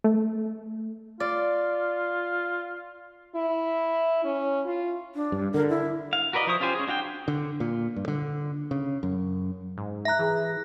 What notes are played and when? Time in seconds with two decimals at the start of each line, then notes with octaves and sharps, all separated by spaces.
0.04 A3
1.20 F4 D5
3.35 E4
4.24 C#4
4.66 F4
5.14 D4
5.32 G2
5.54 D3 A#4
5.69 E4
6.13 F5
6.33 F#4 A#4 B4 D5 D#5
6.47 F3 E4 C5 C#6 D#6
6.60 C#4 F4 G4 C5 G#5
6.75 C#4 G#4
6.87 D4 F#4 F5 G5
7.28 D3
7.60 A#2
7.96 G2
8.08 D3
8.71 C#3
9.03 F#2
9.77 G#2
10.05 E5 A#5 F#6 A#6
10.19 E3 G#4